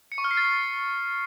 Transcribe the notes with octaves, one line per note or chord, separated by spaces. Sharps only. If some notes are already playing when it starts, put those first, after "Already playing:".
C#7
C#6
F6
C7
A6